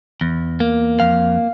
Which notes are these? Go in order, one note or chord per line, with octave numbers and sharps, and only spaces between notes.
E2
A#3
F2 F5